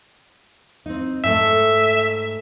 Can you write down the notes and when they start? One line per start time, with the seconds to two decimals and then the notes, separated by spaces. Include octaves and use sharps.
0.86 C4 D#4
1.24 G#2 A3 A4 E5